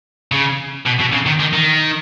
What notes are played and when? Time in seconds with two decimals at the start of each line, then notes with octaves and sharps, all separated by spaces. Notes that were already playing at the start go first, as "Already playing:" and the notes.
0.32 C#3
0.86 B2
0.99 B2
1.12 C#3
1.26 D#3
1.40 D#3
1.53 D#3